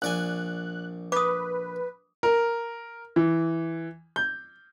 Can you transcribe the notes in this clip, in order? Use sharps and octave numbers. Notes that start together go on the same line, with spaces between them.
A#1 D5 G#5 F#6
B4 D6 D#6
A#4
E3
G6